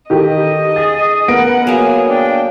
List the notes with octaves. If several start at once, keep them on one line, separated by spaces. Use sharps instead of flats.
D#3 G4 A4 D#5
G#4 A6
B3 A#4 F#5 A#6 D7
F#3 A#3 G#4 G#5
D4 G5